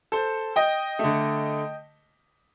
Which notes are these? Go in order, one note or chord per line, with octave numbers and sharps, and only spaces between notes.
A4 C5
D#5 G5
D3 A3